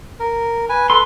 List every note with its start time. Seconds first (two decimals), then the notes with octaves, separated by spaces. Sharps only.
0.20 A#4
0.69 B4 G#5
0.90 A4 B4 C6